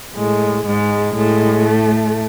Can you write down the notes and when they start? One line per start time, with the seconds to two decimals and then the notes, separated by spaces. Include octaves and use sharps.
0.16 A2 G#3
0.66 G#2 G#3
1.15 A2 G#3
1.66 A3